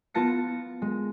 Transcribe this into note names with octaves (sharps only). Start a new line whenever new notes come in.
B3 F4 A5 A#6 C#7
G#3